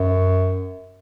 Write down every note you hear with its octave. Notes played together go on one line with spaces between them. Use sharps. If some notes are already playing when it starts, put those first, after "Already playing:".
Already playing: F#2